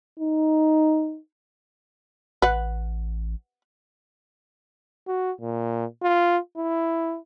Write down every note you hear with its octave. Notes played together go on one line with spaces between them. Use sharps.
D#4
A1 B4 F#5
F#4
A#2
F4
E4